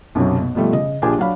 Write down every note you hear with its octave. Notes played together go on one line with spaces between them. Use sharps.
B1 F#2 C3 F#3
B2
B2 F3 G3 A3
C#3 D#5
A#1 D4 F4 G4 G#4 G#5
F#3 D4 F5 B5